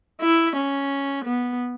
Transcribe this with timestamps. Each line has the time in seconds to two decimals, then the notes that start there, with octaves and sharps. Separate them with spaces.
0.22 E4
0.56 C#4
1.25 B3